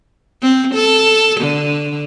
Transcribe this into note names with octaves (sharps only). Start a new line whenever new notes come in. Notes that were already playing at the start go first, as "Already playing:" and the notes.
C4
A4
D3